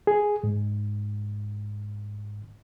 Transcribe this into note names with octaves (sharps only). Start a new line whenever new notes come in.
G#4
G#2